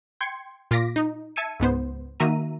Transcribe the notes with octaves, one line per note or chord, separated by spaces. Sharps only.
G5 C6 G#6 C#7
A#2 F4 D6 A#6 B6
D#4
E5 A5 E6 G#6 C#7 D#7
C#2 G#2 B3 C5
D#3 A#3 F#4 E5 A#5 D#7